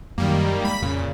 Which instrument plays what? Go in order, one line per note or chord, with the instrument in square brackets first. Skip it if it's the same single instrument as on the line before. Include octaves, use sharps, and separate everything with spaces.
[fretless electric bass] F#2 [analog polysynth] D#3 G3 A#3
[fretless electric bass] G#3 [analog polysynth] B5 B6
[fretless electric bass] F2 [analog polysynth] A#2 C#3